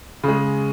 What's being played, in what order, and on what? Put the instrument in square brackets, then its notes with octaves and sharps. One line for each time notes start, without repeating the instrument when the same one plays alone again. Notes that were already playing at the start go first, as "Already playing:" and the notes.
[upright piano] C#3 G#3